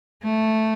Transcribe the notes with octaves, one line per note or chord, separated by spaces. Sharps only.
A3